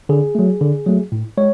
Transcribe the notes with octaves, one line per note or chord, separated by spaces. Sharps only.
D3 G#4
F#3 A3
D3
F#3 A3
A2
G#3 C#5